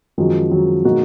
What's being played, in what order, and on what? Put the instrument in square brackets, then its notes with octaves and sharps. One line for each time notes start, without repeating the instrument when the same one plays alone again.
[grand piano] F#2 F3 G#3 C#4 [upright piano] D#3 F#3
[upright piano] D#3 F#3
[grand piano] B2 G#3 D#4 F#4 [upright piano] F#3 A#3